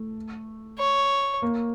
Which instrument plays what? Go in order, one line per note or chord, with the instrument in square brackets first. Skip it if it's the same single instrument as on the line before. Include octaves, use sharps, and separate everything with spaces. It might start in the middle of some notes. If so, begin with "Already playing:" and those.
Already playing: [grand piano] A3
[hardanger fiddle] C#5
[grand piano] A#3